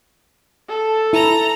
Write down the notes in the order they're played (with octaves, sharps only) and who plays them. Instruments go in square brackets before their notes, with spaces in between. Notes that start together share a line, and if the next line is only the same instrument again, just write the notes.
[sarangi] A4
[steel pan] E4 [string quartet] A#5